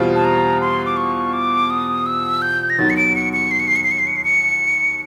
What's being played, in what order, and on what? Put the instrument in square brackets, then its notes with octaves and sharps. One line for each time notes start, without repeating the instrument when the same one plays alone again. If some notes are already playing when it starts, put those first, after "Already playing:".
Already playing: [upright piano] E2 B2 G3 C4 F4
[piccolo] A5
A#5
C6
D6
C#6
D6
D#6
E6
G6
A#6
[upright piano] D#2 D#3 F#3 B3 D#4 [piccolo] A6
[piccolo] C#7
D7
C#7
C#7
C7
C#7
C7
C#7
C7
C#7
C7
C#7
C7
C#7